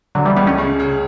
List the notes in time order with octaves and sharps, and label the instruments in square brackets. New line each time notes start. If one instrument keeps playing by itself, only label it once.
[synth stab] D3 F#3 [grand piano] D4
[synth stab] E3 G3
[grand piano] C#2 [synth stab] G3 B3
[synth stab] A3 C#4
[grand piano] C#3
C#3